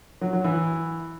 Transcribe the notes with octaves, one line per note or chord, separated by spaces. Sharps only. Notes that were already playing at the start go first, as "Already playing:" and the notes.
F#3
F#3
E3